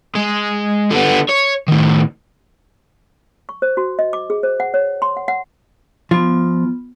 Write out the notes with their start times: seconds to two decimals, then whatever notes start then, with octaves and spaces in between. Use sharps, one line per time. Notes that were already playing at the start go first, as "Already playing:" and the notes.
0.15 G#3
0.91 D3 B3
1.29 C#5
1.68 A2 D#3
3.49 C#6
3.62 C5
3.77 F#4
3.99 D#5
4.13 D6
4.30 G#4
4.43 C5
4.60 F#5
4.74 C#5
5.02 C6
5.17 F#5
5.28 F#5
6.11 F3 B3 F4